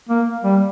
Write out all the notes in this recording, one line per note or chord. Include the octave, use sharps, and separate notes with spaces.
A#3
G3